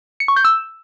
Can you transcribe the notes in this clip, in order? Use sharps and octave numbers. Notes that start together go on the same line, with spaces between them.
C#7
C#6
G6
E6